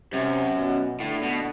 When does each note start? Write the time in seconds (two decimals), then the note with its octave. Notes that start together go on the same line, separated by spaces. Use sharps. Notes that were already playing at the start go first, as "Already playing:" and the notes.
0.13 F#2 C3
0.57 B2
1.01 A2 D3
1.23 B2